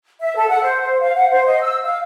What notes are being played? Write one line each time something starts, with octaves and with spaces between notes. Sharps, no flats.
E5
A4
F#5
C5
C5
F5
F#5
C5
D#5
E6
F5